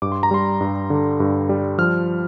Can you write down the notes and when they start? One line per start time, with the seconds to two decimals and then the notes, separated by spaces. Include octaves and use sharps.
0.02 G2 D6
0.12 C6
0.23 A#5
0.31 G3 C6
0.61 G2
0.90 D3
1.20 G2
1.49 G3
1.78 F3 F6